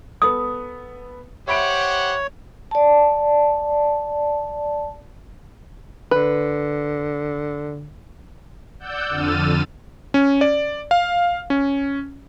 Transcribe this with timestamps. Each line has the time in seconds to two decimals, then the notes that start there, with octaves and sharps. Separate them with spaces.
0.22 B3 A4 D#6
1.48 G4 C5 C#5 E5 F#5 B5 D7
2.71 D5 A5
6.11 D3 B4
8.80 D5 F#5 E6 G6
9.09 F2 D3 E6 F6 A6 D#7
10.14 C#4
10.41 D5
10.91 F5
11.50 C#4